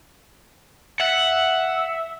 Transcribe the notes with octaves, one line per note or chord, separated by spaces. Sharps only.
E5 F#5